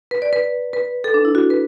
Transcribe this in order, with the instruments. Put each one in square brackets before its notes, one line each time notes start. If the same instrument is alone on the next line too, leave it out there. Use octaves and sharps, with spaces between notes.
[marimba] B4
D5
B4
B4
A4
D4
E4
F#4
B4